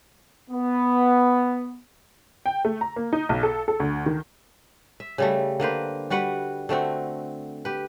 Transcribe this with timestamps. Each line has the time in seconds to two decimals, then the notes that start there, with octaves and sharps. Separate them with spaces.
0.50 B3
2.46 G5
2.65 A3
2.81 A#5
2.96 A#3
3.13 D#4
3.29 B1
3.43 A4
3.68 A4
3.80 D2
4.06 D#3
5.00 E5
5.18 C#3 G3 A3
5.60 D3 A#3 B4 C5
6.10 G3 F#4 B4 F#5
6.69 D3 A3 C4 F#4
7.65 G4 B4